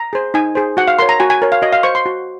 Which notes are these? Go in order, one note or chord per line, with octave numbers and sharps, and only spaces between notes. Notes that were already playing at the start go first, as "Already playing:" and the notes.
Already playing: A#5
G#4 C5
D#4 G#5
G#4 C5
F#4 F#5
F5
A#4 C#5 C6
A#5
F#4 G#5
G#5
A#4 C#5
F5
F#4 D#5
F5
C5 C#6
C6
F#4